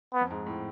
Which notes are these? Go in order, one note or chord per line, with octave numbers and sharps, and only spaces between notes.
B3
F2
G#2
A2